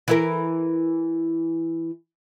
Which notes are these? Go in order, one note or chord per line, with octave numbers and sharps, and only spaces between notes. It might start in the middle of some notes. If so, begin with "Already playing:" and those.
E3 E4 A#4